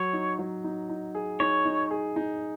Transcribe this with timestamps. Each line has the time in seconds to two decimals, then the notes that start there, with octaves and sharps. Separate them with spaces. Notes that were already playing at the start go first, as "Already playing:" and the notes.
Already playing: F#3 C#5
0.13 D#4
0.39 F#3
0.64 D#4
0.89 D#4
1.15 G#4
1.40 D#4 C#5
1.65 D#4
1.91 G#4
2.16 D#4